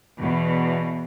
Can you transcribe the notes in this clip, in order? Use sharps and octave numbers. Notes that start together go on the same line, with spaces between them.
E2 B2